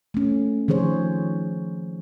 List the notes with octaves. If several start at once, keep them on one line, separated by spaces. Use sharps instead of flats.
A3 C#4
D#3 F3 G#4 C5 C#5